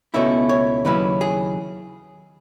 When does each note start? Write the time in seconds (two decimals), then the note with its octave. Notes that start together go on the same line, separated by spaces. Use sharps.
0.14 C#2 B2 A3 C#4 E4 E5
0.49 C#5
0.85 D#2 C#3 F#3 C#4 E4 B4
1.21 G#4